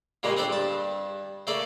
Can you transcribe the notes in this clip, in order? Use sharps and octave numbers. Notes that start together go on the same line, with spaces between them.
A#2 C#3 G3 G#3 A#3
C4 D4 A4 C5 G5
G2 A5
C#3 A3 A#3 A4 D5